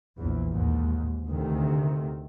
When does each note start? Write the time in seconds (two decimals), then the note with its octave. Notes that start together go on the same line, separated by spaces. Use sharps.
0.17 A#1 E2
0.50 D#2 G#2
1.27 D2 C3 D#3